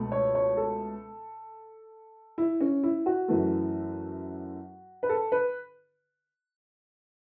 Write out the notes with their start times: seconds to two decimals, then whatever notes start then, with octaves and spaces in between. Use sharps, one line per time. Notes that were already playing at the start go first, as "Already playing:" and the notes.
Already playing: C#2 B2 A3
0.12 C#5
0.35 C#5
0.57 A4
2.38 E4
2.61 C#4
2.83 E4
3.06 F#4
3.28 F#2 E3 A3
5.03 B4
5.09 A4
5.32 B4